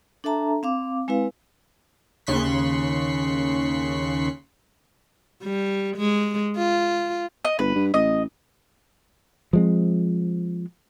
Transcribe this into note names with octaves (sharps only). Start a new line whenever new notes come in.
D4 A4 E5 A5 A#5
C4 F5 D6
G#3 C4 E4 B4 F5
D#2 C#3 C6 C#6 F#6 B6
G3
G#3
F4
D#5
G1 B4
G2
A1 D#5
F3 G#3 C4